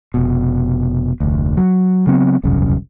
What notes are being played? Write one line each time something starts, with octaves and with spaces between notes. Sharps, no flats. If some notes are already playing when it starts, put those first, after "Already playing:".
F1 B2
F1 D2
F#3
C#3 F#3 B3 C4
E1 C2 F#2 C#3